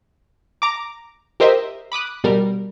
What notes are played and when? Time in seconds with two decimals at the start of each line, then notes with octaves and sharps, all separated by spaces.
0.62 A#5 D6
1.40 G4 A#4 C5 D#5 E5
1.92 B5 D6 D#6 F#6
2.24 B2 G3 A#4